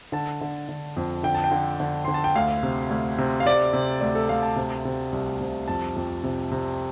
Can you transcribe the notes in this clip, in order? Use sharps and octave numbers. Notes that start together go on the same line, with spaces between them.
D3 A5
D3
D3
F2
D3 G5
A5
G5
D3
D3
D3 C6
A5
G5
D2 F5
C3
D2
C3
F5
C3 D5
C3
D2 D5
A4
D2 F5
A5
C3
C3
C2
C3
F2 A5
F2
C3
C3